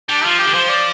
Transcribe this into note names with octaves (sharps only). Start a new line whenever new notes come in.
G3 D4
F3 F4
G4
D3
F3 C5
D5